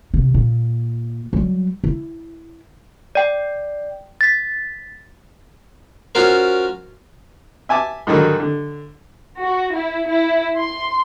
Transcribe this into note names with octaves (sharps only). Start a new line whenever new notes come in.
C3
A#2
F#3 G3
E4
D5 G5
A6 B6
C#4 F4 F#4 A#4 C5
E5 G#5 A5 D6
G#2 D3 D#3 F#3 G3
D3
F#4
E4
E4
C6